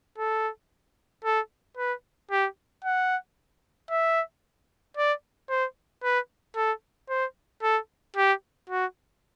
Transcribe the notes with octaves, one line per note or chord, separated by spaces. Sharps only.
A4
A4
B4
G4
F#5
E5
D5
C5
B4
A4
C5
A4
G4
F#4